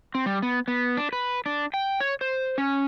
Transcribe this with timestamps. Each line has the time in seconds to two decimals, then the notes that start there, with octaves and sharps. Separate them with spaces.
0.15 C4
0.26 G3
0.42 B3
0.68 B3
0.97 D4
1.13 B4
1.46 D4
1.74 G5
2.00 C#5
2.21 C5
2.58 C#4